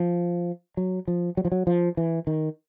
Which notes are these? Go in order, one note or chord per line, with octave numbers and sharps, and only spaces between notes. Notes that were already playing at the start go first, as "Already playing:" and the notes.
Already playing: F3
F#3
F3
F#3
F3
F#3
F3
E3
D#3